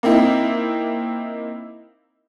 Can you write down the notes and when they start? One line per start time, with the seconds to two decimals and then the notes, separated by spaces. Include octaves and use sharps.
0.03 A#3 C4 D#4 E4